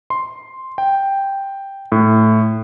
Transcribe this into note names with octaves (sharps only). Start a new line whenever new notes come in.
C6
G5
A2